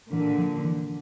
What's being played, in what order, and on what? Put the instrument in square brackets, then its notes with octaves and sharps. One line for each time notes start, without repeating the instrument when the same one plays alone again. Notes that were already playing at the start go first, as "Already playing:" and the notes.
[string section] A#2 D3 [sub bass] E3
[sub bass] F3
E3